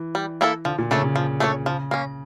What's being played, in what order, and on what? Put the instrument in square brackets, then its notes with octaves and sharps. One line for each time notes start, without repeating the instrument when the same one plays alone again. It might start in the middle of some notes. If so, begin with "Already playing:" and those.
Already playing: [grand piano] E3
[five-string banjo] G3
A#3 E4 A4
[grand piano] D3 [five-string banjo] F3
[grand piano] A#2
[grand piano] C#3 [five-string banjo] A3 D4 A4 C#5
[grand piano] C#3
[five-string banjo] F3
A3 D4 A4 C#5
[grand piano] C#3 [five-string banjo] F3
[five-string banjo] A#3 C#4